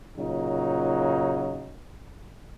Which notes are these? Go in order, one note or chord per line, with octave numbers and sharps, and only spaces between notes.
A#2 C#3 F#3 D#4